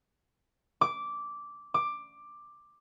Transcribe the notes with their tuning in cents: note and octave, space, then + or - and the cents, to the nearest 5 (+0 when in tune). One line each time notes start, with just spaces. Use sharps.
D6 -10
D6 +10